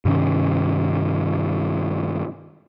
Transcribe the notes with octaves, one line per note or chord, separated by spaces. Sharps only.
G2 C3 D#3 C#4